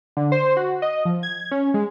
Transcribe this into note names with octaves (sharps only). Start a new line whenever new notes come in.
D3
C5
F#4
D#5
F3
G#6
C#4
G#3